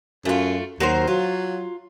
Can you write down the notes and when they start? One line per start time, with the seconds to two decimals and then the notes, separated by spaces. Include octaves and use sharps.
0.25 F#2 A3 F4
0.80 D#2 F#3 A#4 C5
1.07 F#3 F4